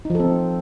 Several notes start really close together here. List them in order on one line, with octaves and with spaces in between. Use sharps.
D#4 F3 A4 C4